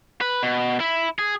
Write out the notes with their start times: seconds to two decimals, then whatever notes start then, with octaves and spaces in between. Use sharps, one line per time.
0.21 B4
0.43 B2
0.80 E4
1.19 G#4